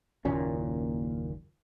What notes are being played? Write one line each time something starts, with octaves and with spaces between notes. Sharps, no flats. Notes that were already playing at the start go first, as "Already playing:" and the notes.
F#1 D#2 A#2 C#4